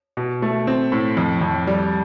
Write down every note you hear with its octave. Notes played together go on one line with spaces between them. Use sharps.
B2
A3
C4
A2
F2
F2
G3